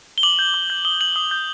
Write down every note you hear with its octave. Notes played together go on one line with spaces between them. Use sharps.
G7
D6 F#7
G6
D6
G6
D#6 G7
G6 F#7
D#6
G6